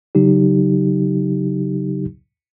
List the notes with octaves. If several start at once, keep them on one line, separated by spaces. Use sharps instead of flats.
C#3 F#3 D#4 G4